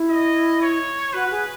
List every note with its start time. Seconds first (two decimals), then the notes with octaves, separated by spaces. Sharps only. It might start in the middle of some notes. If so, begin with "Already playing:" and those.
Already playing: E4
0.10 D#5
0.62 C#5
1.13 F#4 B4
1.31 G#4